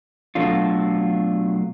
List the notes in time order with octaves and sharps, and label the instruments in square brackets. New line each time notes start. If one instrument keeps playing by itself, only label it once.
[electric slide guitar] B2 F#3 A3 D4 F4